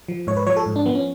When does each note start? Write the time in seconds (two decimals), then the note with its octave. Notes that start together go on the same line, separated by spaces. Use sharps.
0.08 F3
0.27 G#2 C#5
0.37 B4
0.47 F3 C#5
0.57 A4
0.66 G#2
0.76 D4
0.85 F3 B3
0.95 C#4